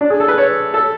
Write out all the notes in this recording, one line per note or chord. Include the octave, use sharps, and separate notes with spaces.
D4
G#4
A4
B4
C#5
A4